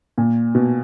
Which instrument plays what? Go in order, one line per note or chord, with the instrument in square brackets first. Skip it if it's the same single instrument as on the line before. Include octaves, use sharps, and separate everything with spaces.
[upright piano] A#2
B2